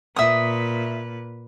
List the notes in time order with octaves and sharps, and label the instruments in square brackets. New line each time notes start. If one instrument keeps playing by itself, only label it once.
[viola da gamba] A#2 B4 [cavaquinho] E5 D#6